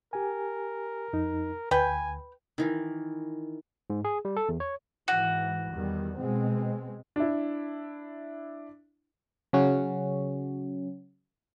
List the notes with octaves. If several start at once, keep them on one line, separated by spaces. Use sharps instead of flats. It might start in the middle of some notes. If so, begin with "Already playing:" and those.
G4 A#4 G#5
F2 D#4
D2 B4 G5 G#5
D#3 E3
G#2
G#4
G3
A4
E2
C#5
G#2 E3 F#4
E2 D#3 G3
B2 G#3 C4
D4 E4
C#3 F#3 C#4 F#4